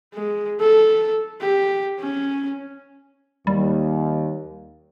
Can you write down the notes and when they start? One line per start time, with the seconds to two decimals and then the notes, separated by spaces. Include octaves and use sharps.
0.14 G#3
0.60 A4
1.41 G4
2.00 C#4
3.47 D#2 G3